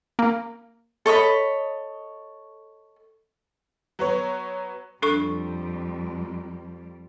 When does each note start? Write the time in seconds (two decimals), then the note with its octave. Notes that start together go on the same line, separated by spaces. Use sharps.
0.19 A#3
1.06 A4 C#5 D#5 B5
3.99 F#3 B3 C#5
5.02 F2 G3 D4 A4 C#6